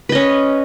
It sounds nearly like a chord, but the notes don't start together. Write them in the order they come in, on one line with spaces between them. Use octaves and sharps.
B4 D#5 C#4